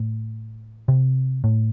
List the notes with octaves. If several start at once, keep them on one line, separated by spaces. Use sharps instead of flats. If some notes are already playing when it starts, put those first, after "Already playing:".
Already playing: A2
C3
A2